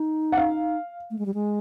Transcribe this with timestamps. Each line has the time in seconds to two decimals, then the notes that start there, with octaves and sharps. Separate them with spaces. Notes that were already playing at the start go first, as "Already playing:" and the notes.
Already playing: D#4
0.32 F#5
0.37 F5
1.11 A3
1.19 G#3
1.26 G3
1.34 G#3